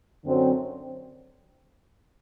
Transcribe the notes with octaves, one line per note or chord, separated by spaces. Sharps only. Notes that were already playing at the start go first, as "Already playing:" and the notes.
F#2 D3 F#3 C4